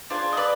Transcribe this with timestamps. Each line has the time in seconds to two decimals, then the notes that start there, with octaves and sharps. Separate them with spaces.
0.10 D4 F4 G#4 C5
0.33 D#5
0.37 B4 D5